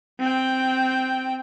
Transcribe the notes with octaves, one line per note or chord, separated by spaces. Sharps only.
C4 G5